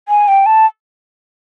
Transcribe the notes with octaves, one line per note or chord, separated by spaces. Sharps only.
G#5
G5
A5